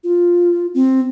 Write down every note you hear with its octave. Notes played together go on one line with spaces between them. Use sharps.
F4
C4